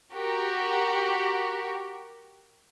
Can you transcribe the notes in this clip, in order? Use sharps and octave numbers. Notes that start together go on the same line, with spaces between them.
F#4 G4 A#4